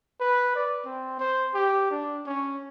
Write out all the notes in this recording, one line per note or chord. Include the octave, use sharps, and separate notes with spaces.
B4
D5
C4
C5
G4
D4
C#4